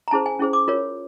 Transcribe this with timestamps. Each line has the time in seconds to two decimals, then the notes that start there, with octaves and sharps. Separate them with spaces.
0.08 A#5
0.11 C#4 E4 G#4 C5 A5
0.26 G#5
0.39 C#4 E4 G#4 C5
0.53 D6
0.68 F4 A#4 C#5